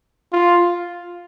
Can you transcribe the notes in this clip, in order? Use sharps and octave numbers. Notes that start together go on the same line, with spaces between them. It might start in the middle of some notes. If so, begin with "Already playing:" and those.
F4